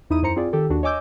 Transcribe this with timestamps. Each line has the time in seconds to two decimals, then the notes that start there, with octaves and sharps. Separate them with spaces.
0.10 E2 D#4 E4 D#6 D#7
0.22 F#2 E4 C5 A#5 C#7
0.36 C4 F4 G#4 D5
0.53 D#3 G4 A4
0.70 D#2 D4 F#4
0.83 C#5 D#5 G#5 D6 E6 G6